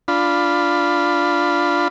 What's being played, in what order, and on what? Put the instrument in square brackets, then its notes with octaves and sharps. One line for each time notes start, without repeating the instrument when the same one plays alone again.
[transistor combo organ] D4 F4 B5